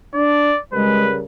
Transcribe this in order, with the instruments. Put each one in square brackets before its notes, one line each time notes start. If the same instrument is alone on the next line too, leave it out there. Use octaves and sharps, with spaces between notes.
[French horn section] D4 [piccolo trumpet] D5
[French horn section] C#3 G3 A#4 [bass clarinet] G#3 [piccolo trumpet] B4